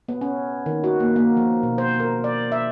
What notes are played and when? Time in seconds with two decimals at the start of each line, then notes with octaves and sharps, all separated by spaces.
0.08 B3
0.21 C#4
0.66 D#3
0.84 F#4
1.00 A#3
1.16 A#3
1.37 F3
1.63 B2
1.78 C5
2.00 A#4
2.24 D5
2.52 E5